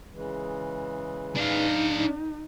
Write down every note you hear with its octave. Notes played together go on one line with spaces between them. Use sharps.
C#3 E3 G#3
D4 D#4 F5